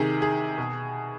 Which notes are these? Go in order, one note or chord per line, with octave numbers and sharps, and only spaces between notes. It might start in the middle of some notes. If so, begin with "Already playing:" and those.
Already playing: C3 D#3 G#4
G#4
B2